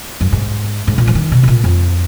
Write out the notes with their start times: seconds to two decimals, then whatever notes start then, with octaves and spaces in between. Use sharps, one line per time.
0.21 F#2
0.32 G#2
0.87 G#2
0.98 A#2
1.07 F3
1.15 D#3
1.32 B2
1.43 B2
1.48 A#2
1.64 F2